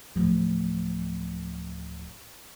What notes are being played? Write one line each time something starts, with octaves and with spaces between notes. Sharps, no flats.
D1 F3